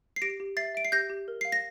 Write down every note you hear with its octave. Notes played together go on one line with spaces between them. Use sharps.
C7
G4 A#6 D7
G4
E5 A6 C7
E5 D7
C7
G4 G6 A#6
G4
A#4
F5 C7
A#6